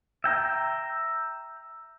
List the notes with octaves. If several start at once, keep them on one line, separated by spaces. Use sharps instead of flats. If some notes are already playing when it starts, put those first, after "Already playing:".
E5 G5 A#5